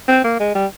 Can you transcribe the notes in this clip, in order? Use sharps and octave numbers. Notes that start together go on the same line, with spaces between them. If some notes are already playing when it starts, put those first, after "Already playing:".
C4
A#3
G#3
G3